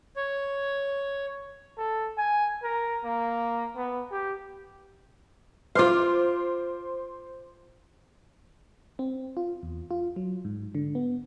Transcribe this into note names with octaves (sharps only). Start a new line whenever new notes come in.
C#5
A4
G#5
A#4
A#3
B3
G4
F4 C5 F5 C6 D6
C4
F4
E2
F4
F#3
G#2
D3
B3